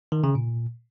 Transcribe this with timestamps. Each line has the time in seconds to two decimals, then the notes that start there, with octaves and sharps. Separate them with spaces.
0.12 D#3
0.24 C#3
0.35 A#2